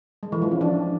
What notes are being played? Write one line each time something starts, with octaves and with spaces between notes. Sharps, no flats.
G#3
E3
F3
C#4
D4